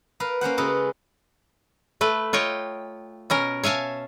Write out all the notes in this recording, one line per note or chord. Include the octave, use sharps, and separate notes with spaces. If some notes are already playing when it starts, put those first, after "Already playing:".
A#4 B4 F5
A#3 C#4 C5 F#5
C#3 G#3 F#4 G#4 A4 B4
A3 A4 B4
F4 C#5 D#5 G5
B2 C#4 A#4
C#5 E5 F5 G#5 A5